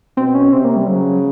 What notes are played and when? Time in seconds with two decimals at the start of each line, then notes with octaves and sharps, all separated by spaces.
0.17 B2 C4
0.35 C#4
0.52 C3 C4
0.65 A#3
0.76 G3
0.88 C#3 F#3